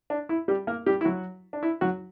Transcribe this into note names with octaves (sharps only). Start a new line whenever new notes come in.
D4
E4
G3 G4
A#3 A#4
G3 G4
E4
F#3 F#4
D4
E4
F#3 F#4